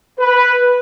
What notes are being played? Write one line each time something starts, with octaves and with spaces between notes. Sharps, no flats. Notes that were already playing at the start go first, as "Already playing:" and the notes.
B4